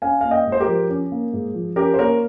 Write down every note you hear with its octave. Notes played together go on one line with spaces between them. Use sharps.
C#4 F5 G#5
A#3 F5
D#5 G5
G#2
C5
G4 A#4
F3
C#4
A#3
G#2
F3
C#4 G4 A#4
C5
A#3 A#4 C#5